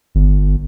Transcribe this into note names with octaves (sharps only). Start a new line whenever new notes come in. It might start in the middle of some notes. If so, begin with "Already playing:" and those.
G1